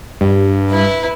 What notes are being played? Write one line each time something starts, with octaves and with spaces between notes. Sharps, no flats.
G2
E4 B4